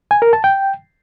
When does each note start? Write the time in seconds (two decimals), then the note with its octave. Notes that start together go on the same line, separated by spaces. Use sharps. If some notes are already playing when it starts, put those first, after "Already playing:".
0.11 G#5
0.22 A#4
0.33 A5
0.44 G5